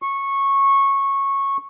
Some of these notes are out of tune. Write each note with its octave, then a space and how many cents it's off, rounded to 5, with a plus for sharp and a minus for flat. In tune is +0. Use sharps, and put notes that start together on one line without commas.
C#6 -15